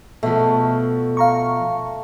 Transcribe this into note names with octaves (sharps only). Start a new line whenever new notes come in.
B2 F3 A3
F5 A#5 C#6